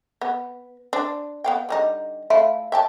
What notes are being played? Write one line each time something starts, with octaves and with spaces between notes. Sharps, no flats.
B3
D4 C5
B3 F5 G5
D3 G3 D#4
A3 E4 F4
E5 G5 A5